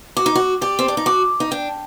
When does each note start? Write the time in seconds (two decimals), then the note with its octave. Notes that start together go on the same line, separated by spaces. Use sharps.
0.16 F#4 D6
0.26 D#4
0.35 F#4
0.61 G4 D5
0.79 C4
0.88 D4
0.97 D#4
1.06 F#4 D6
1.40 D#4
1.51 D4 G5